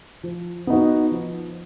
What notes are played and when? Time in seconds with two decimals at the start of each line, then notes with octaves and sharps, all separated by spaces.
0.23 F3
0.67 B3 D#4 F#4
1.12 F3